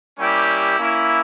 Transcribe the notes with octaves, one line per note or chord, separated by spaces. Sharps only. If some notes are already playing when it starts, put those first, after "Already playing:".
G3 A#3 C#4 E4 G4
A#3 C#4 E4